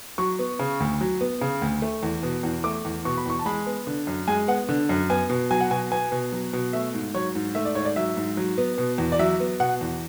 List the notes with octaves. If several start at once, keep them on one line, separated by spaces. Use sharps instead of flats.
F#3 C#6
B3
C#3
D2
F#3
B3
C#3
D2
A3
E2
B2
E2
A3 D6
E2
B2 C#6
B5
E2 C#6
A5
G#3 B5
B3
D3
F#2
G#3 G#5
B3 F#5
D3
F#2
B3 G#5
B2
F#3 G#5
F#5
B2 G#5
B3 G#5
B2
F#3
B2
A3 E5
G#2
F#3 C#5
G#2
A3 E5
D5
G#2 C#5
D5
F#3 E5
G#2
F#3
B3
B2
E2
D5
F#3 E5
B3
B2 F#5
E2